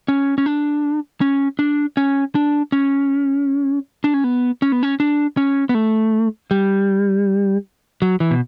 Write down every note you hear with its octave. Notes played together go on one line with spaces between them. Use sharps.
C#4
C#4
D4
C#4
D4
C#4
D4
C#4
D4
C#4
B3
C#4
B3
C#4
D4
C#4
B3
A3
G3
F#3
E3
B2